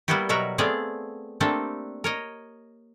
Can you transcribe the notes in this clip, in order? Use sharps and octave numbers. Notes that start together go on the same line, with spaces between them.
G3 A#3 B3 E4 F#4 G4
B2 F#3 G3 F#4 A#4 E5
A3 B3 C4 G#4 D5 F5
A3 A#3 C4 D4 G4 A4
A#4 C#5 D#5